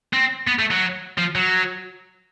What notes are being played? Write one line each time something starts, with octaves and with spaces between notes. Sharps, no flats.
C4
B3
A3
F#3
F3
F#3